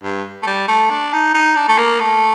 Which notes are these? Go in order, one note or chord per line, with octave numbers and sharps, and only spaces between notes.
G2
A3
G3
A3
D4
D#4
D#4
D4
A3
A#3
A3